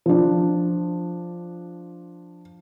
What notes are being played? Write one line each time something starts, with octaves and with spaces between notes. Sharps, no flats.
F3 D4